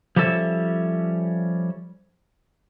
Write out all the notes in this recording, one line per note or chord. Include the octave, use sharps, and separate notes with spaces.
F3 G3 C#4 A4 E5